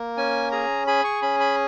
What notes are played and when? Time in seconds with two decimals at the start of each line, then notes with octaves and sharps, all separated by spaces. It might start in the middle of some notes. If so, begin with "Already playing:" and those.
Already playing: A#3
0.17 C#4 G#5
0.52 G#4 A#5
0.87 G#4 B5
1.04 C#6
1.22 C#4 B5
1.40 B5